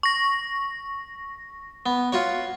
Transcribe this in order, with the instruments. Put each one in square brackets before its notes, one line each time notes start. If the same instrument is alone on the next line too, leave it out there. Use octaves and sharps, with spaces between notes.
[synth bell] C#6 A#6
[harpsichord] B3
F4 F#4 C#5